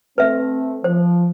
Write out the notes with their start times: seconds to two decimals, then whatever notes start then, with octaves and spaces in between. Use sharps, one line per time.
0.18 A3 C4 B4 E5
0.84 F3 C5